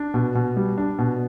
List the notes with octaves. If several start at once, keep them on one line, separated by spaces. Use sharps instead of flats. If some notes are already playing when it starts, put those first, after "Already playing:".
Already playing: D4
B2
B2
G3
D4
B2